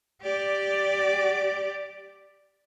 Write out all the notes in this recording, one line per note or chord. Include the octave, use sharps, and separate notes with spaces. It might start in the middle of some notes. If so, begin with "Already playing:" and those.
G4 D5